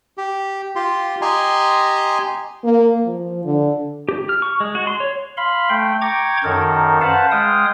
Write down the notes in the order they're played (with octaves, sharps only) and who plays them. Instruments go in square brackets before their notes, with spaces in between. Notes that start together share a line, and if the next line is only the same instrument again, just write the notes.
[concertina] G4
F4 G4 C6
G4 D#5 G#5 A#5 C6
[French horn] A#3
F3
D3
[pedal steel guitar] G4
F6
C#6
G#3
F#4
C6
C#5
[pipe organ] F5 B5 C6
A3 G5
G5 A#5 C#6 D6 G#6
F#2 D#3 A4 A#4
B4 C5 F5 F#5 A5
G#3 F5 G5 D#6